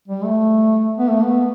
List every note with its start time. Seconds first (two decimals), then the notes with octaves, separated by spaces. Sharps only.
0.08 G3
0.24 A3
0.98 B3
1.10 A3
1.25 B3